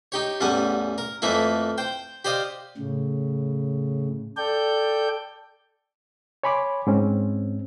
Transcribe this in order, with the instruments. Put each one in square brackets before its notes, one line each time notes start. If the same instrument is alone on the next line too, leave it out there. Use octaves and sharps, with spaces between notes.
[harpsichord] D#4 G4 C#5
A1 E2 G3 C#4 F#5 G#5
A#4
F2 E3 A3 A#3 E4
C5 G5
G4 C5 D5 D#5 F5
[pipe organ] A2 C#3
A4 D5 G5 G6
[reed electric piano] C#5 G#5 B5 C6 D6
G#2 C4 C#4